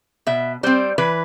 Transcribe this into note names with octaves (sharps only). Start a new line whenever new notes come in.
B2 E5
G3 C4 C5
E3 B4